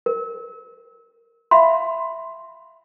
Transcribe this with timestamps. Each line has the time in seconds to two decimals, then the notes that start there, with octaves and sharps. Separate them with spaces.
0.06 A#4
1.51 E5 F5 B5 C6